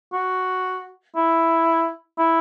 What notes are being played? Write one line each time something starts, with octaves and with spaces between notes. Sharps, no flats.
F#4
E4
E4